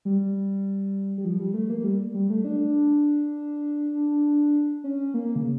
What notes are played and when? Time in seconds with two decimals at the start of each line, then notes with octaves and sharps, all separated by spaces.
0.05 G3
1.18 G3
1.25 F3
1.40 G3
1.54 A3
1.70 A#3
1.84 G3
2.14 G3
2.30 A3
2.45 D4
4.84 C#4
5.14 A#3
5.36 C#3